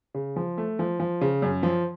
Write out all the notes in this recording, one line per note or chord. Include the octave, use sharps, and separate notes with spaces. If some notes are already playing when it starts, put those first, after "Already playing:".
C#3
F3
A3
F3
F3
C#3
F#2
F3